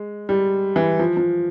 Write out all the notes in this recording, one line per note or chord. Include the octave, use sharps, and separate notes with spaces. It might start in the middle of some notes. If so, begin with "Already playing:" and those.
Already playing: G#3
G3
E3
F3
F3